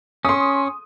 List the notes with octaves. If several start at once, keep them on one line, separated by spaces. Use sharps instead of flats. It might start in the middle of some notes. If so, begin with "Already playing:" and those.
C#4 C6 D#6